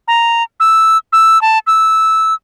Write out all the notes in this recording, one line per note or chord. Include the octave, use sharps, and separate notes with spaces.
A#5
E6
E6
A5
E6